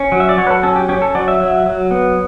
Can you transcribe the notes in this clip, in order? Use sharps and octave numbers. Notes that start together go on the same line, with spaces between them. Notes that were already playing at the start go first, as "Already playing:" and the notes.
Already playing: C#4
F#3
E5
D5
F#3 C#5
B4
A4
C#4 A4
G4
C#4 G4
A4
F#3 D5
E5
F#3 E5
F#3
B3